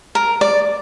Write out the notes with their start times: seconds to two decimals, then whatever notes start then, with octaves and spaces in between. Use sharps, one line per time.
0.15 A#4
0.41 D5